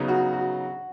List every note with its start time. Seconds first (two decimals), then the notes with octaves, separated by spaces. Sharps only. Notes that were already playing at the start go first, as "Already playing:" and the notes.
Already playing: C#3 F#3 B3 D#4
0.08 F#4
0.33 F#4